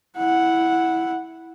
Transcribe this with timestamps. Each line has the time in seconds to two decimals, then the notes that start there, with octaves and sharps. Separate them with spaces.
0.17 E4 F#5